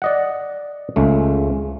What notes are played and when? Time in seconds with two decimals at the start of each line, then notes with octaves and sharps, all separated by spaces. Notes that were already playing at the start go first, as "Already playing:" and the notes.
0.02 D5 D#5 F#5
0.96 C#2 C#3 G#3 A3